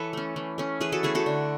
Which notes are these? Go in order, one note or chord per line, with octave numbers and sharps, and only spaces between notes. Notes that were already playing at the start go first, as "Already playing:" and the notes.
Already playing: E3 A4 B4 C#5
A3 C#4
E3
A3 C#4
E3 G#4 B4
F#4 A4
A3 C#4 E4 G#4
F#4 A4
D3